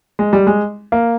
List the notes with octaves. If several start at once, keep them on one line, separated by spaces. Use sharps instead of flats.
G#3
G3
G#3
A#3